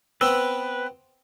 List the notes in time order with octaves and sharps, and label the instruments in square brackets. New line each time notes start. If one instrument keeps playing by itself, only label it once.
[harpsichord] B3 C4 [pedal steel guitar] B4 [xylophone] E6